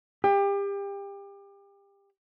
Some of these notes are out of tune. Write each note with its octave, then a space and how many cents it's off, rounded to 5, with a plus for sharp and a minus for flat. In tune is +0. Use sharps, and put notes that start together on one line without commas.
G4 +30